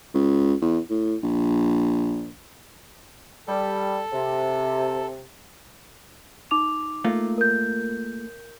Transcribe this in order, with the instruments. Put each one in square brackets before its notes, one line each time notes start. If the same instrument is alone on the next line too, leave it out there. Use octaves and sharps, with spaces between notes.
[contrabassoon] C#2
E2
A2
A#1
[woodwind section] G3 [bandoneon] A4
[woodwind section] C3
[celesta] D#4 D6 F7
[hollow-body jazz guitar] A3 A#3 F4
[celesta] A#4 G6